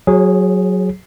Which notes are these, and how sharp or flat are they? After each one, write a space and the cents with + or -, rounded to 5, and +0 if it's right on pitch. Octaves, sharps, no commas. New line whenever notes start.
F#3 +0 G#4 +0 C#5 -40